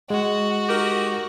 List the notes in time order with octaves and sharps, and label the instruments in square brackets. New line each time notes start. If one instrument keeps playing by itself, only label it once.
[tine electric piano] G#3 [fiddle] F#4
[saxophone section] D#4 G4 A#4